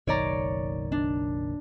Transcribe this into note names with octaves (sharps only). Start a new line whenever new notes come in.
F#1 B1 D#3 C#5 D5 A#5
D4